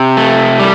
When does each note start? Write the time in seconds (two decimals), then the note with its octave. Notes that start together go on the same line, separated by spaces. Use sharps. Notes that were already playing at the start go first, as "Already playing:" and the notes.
Already playing: C3
0.17 A3
0.60 G3